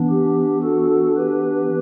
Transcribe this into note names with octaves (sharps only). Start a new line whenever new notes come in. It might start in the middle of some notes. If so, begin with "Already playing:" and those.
Already playing: E3 B3 D4
G4
F#4 A4
G4 B4